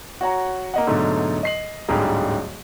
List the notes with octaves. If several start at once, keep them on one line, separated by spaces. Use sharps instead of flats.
F#4 C#5 F#5 A#5
A#3 D#5 F#5
G#2 B2 D3 F#3 A3
D#5 C7 F#7
D1 G#2 D3 G3 G#4 A#5